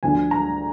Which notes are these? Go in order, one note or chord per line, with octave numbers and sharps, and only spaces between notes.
D2 D3 F3 G#5
A#5